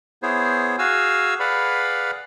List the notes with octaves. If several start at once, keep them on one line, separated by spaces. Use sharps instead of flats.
B3 E4 G#4 C5 C#5
F#4 G#4 F5 G#5 E6
G#4 B4 D5 F5 F#5 B5